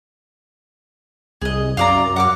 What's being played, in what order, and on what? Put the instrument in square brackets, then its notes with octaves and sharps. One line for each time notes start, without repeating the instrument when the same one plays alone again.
[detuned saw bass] C2 [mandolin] G#4 D#5
[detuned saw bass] F#2 [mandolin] F4 D5 A#5
[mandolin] F#5 D6 F6